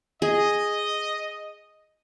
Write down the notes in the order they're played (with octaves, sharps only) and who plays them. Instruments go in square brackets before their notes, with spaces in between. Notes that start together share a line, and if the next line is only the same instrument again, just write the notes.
[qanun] G#4 [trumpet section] D#5